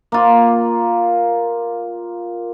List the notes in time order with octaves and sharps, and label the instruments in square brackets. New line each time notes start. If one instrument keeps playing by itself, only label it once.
[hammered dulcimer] A#3 F4